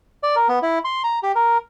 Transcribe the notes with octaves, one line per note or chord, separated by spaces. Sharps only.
D5
A#4
B3
E4
C6
A#5
G4
A#4